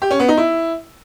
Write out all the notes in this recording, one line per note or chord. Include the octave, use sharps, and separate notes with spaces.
G4
C#4
B3
D#4
E4